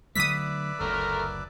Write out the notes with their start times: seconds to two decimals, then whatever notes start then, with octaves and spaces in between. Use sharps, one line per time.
0.16 D3 F#3 A3 B4 D5 E5 D#6 B6
0.80 F#1 D2 A3 A#4 F6